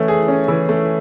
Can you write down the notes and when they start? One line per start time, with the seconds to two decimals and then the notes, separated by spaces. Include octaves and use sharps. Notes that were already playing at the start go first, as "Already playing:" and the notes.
Already playing: E3 A3 C#4
0.08 G#4
0.28 C#4
0.48 E3
0.69 A3